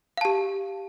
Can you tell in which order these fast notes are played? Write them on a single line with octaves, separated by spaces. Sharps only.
F5 A5 G4